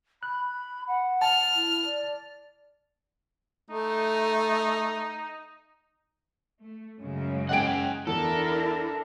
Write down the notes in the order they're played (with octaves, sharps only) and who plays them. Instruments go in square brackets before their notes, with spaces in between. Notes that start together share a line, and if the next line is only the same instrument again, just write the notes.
[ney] B5 [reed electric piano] F#6
[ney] F#5
[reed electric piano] A5 [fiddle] F6
[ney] E4
D5
[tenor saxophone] A3 [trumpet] D#4
[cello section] A3
F#2 C#3 G#3
[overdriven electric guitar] G#4 F#5 [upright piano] D#5 G5 D7
[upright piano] E2 [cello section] D4 E4 A#4 [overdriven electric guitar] A4